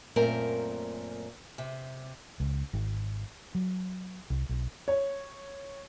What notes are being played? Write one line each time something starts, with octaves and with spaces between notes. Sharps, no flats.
F#2 A#2 A3 C4 A#4
C3
C#2
G#1
F#3
C2
B1
C#5